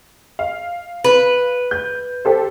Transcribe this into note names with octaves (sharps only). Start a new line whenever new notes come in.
F5
B4
G6
G4 A4 C5